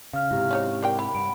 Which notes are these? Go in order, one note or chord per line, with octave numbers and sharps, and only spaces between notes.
C#3 F5 F6
G#2 C3 E4 G4
C#4 D#4 C#5
D4 A#4 G5
E4 B5
G2 F#5 D7